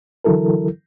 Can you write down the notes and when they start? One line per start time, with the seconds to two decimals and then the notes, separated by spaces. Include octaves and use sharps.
0.24 D3 E3 F#3 E4 A4 A#4